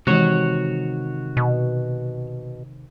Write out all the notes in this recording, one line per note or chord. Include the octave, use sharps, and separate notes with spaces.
C3 D#3 E3 G#3 F#4 C#5
B2